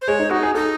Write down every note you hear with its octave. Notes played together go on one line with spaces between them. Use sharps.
C5
G#3 C#5
D#4
D#4 F#4
G#4
D#4 A4